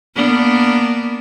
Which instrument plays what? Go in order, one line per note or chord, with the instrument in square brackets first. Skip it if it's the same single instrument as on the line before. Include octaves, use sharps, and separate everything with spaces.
[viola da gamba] A#3 B3 D4